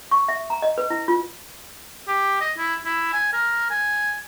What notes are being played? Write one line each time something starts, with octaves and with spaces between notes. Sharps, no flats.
C#6
E5
A#5
D#5
B4
E4
F4
G4
D#5
E4
E4
G#5
A#4
G#5